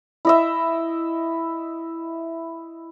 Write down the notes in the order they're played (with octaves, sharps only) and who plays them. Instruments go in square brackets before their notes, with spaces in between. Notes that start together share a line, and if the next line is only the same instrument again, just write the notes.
[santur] E4 D#5 E5